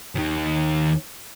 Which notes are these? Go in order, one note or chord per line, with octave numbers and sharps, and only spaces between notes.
D#2 D#3